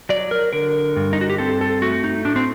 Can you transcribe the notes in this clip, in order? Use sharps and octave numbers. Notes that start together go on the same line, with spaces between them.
F#3 D5
A#4
D3 A#4
G2
D#4
F#4
G4
C4 A4
A4
A3 F#4
D#4
A2 D4
C4